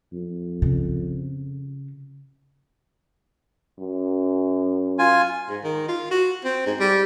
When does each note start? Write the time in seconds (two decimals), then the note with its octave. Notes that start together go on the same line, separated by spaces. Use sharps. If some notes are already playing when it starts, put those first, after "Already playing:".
0.12 F2
0.62 C#3
3.78 F#2
4.99 F4 G#5
5.49 G#2
5.64 D#3
5.89 F4
6.11 F#4
6.45 C4
6.67 G#2
6.80 G3